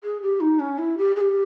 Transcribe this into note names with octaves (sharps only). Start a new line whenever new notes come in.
G#4
G4
D#4
C#4
E4
G4
G#4
G4